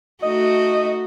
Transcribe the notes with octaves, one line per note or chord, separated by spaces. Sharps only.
A3 D#4 F#4 D#5